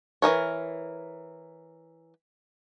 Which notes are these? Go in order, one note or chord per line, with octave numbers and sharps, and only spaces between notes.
E3 A#3 A#4 C#5